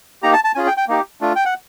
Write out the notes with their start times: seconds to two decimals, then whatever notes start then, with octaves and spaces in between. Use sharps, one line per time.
0.22 A#3 D#4 G4 A#5
0.33 A5
0.44 A5
0.55 C#4 F4 G#4 G#5
0.67 G5
0.77 G5
0.88 A#3 D#4 G4
1.21 A3 D4 F4
1.36 G5
1.45 F#5